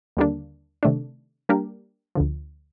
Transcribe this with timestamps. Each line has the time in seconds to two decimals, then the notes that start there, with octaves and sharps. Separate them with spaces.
0.17 D#2 D3 G3 A#3 D4
0.83 C3 D#3 A3 D4
1.49 G3 A#3 D4 G4 A#4
2.15 D2 D3 F3